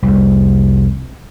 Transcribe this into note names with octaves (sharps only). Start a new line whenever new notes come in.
C2 F2